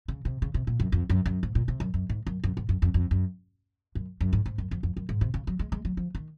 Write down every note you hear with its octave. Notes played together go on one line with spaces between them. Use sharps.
C#3
C3
C#3
C3
A#2
F#2
F2
F#2
F#2
G#2
A#2
C3
F#2
F#2
G#2
F#2
F#2
G#2
F#2
F2
F2
F#2
F#2
F#2
G#2
G#2
F#2
F2
F2
F#2
G#2
C3
C#3
F#3
G#3
G#3
F#3
F3
D#3